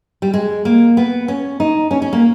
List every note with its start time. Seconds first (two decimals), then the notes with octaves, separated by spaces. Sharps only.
0.22 G3
0.34 G#3
0.65 A#3
0.97 B3
1.28 C#4
1.60 D#4
1.91 C#4
2.02 C#4
2.13 A#3